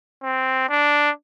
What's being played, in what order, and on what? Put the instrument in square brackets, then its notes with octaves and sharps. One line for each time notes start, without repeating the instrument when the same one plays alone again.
[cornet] C4
D4